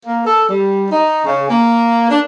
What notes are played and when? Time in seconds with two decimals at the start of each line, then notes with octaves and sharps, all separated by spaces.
0.05 A#3
0.27 A4
0.49 G3
0.91 D#4
1.25 C#3
1.50 A#3
2.10 D4